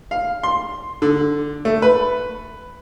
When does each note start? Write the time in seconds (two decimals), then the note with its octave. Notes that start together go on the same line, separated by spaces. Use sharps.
0.11 F5
0.43 C6
1.02 D3
1.65 A3
1.82 B4